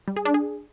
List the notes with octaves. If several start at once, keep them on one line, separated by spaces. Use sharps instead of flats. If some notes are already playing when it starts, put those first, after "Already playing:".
G3
G#4
D4
G#4